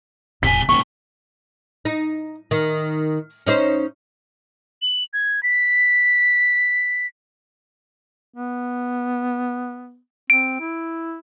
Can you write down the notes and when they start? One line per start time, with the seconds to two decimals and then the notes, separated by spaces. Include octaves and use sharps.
0.43 E1 A2 C3 G#5 B6
0.69 B1 G#2 A#3 C#4 C#6
1.85 D#4
2.51 D#3
3.46 C#4 D#4 C5
4.82 F#7
5.14 G#6
5.43 B6
8.34 B3
10.30 C4 D7
10.60 E4